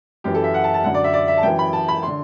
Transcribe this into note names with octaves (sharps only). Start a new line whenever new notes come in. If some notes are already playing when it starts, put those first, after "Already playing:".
F#2 E3 G4
A4
E5
F#5
A5
A5
F#2 D3 F#5
D5
E5
D5
E5
A5
F#2 E3 G5
B5
A5
B5
D3 C6